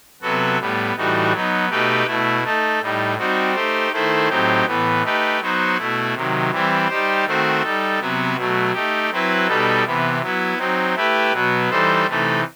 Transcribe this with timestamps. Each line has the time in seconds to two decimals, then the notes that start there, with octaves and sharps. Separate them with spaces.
0.21 C3 F#3 B3 F#4 A4
0.58 A2 G3 B3
0.96 A2 E3 G3 D#4 F#4
1.32 F#3 B3 D#4
1.69 B2 A3 D#4 G4 B4
2.06 B2 A3 E4
2.43 A3 D#4 A4
2.80 A2 G3 D#4
3.18 G3 C4 D#4 F#4
3.54 A3 D#4 G4 C5
3.91 D#3 A3 E4 A4 C5
4.28 A2 F#3 C4 D#4 G4
4.66 A2 E3 B3
5.03 A3 D#4 G4 B4
5.40 F#3 B3 D#4 F#4 C5
5.78 B2 A3 E4
6.14 C3 D#3 F#3
6.51 E3 G3 C4 E4
6.87 G3 D#4 G4 C5
7.24 D#3 A3 C4 F#4 C5
7.63 G3 D#4 A4
8.00 C3 F#3 B3 F#4
8.36 B2 F#3 A3
8.73 A3 D#4 G4
9.11 F#3 C4 E4 B4
9.47 B2 G3 B3 D#4 A4
9.85 C3 E3 B3
10.22 F#3 B3 E4
10.58 F#3 C4 D#4
10.95 A3 E4 G4 B4
11.32 B2 F#3 B3
11.69 E3 G3 D#4 A4 C5
12.06 C3 E3 A3 D#4 A4